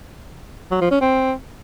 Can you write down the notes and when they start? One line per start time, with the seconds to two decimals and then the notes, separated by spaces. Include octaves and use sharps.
0.71 F#3
0.81 F3
0.91 C#4
1.01 C4